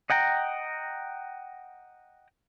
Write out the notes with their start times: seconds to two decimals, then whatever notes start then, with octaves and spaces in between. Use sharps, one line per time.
0.10 D#5 F#5 G5 A#5